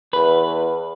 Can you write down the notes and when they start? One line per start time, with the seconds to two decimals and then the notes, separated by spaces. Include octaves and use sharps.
0.13 E2 B4